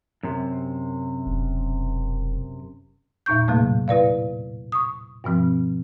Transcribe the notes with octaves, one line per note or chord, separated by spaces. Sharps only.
F#2 C3
E1
E2 A#2 D#4 C#6 G6
A2 C3 F#3 A3 A#3
E4 B4 D5 F5
C#6 D#6
G2 B2 F3 C4